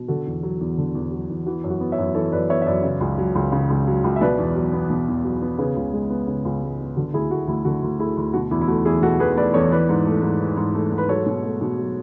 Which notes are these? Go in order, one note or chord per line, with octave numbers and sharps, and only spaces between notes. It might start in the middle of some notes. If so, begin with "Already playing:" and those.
Already playing: B2
D3 F#4 A4
E2
F#3
E2
D3
E2
F#3
E2
E3 F#4
F#2
F#4
B3
C#5 E5
F#2
E3 A4 C#5
F#2 B4 D5
B3 C#5 E5
E5
F#2 B4 D5
C#3
C#2
F#3
C#2
C#3
C#2
F#3
C#2
E5
B2 B4 D5
E2
F#3
B3
B2
E2
F#3
B3
C#3 G#4 B4
C#2
G#3
B3
C#3
C#2
G#3
B3
D3 F#4
D2 E4 G#4
A3 F#4
D2 E4
D3 F#4
D2
A3 E4 G#4
D2
B2 F#4
E2 E4
E4
A3 F#4
E2 E4 G#4
B2 F#4 A4
E2 G#4 B4
A3 B4 D5
E2 A4 C#5
E3 B4 D5
G#2
A3
G#2
E3
G#2
A3
G#2
B4
F#3 A4 C#5
B2
A3
B2
F#3